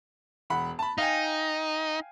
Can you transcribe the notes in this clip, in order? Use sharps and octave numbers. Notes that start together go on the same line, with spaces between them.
E1 F#5 B5
A5 B5
D#4 F5 G5 G#5